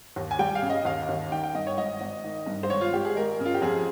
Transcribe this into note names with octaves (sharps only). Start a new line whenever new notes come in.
D#2
G#5
G3 G5
F5
C#3
D#5
D#2 F5
D#2
D#3 G5
G5
G2 D#5
C#5
G#1 D#5
G#1
D#3
G2
C5
G#1 C#5
F4
G#1 G4
G#4
G#3 A#4
C#3
F4
G4
F2 G#4